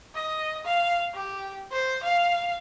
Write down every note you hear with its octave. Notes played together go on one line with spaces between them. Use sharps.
D#5
F5
G4
C5
F5